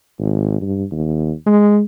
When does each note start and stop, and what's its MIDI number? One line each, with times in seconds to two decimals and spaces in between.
0.19 0.58 32
0.61 0.84 43
0.92 1.32 39
1.46 1.82 56